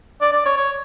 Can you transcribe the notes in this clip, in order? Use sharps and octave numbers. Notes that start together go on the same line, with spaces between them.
D5
D5
C#5
C#5